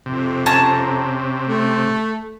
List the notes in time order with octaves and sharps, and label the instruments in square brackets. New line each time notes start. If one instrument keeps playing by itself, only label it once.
[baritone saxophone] F2 [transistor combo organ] C3
[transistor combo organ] C3 [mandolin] C#4 A5 A#5
[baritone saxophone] A3